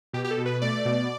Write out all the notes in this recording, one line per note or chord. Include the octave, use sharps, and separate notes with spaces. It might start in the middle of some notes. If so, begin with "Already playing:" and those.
B2 G4
G4
A4
B2
B4
A3 D5
B2